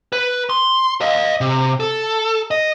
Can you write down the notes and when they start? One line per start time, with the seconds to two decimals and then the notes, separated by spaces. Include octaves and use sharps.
0.13 B4
0.50 C6
1.01 D#5 F5
1.41 C3
1.80 A4
2.51 D#5